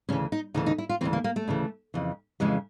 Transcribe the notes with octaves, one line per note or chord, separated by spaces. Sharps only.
D2 C#3 E3 C#4
D#4
D2 C#3 E3 D#4
D#4
E4
F4
D2 C#3 E3 C4
A#3
A#3
A3
D2 C#3 E3
F2 C#3 E3
F2 C#3 E3 G#3